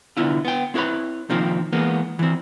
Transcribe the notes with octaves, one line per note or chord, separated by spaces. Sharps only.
C2 D3 B3 E4 F4
B3 G5
C4 E4 G#4 B4 C#5 B5
C3 D#3 F3 A#3 C4
E3 G#3 A#3 B3
E3 C4